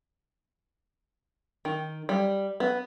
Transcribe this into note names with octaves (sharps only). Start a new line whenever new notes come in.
D#3
G3
B3